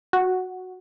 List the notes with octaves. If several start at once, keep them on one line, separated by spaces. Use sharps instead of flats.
F#4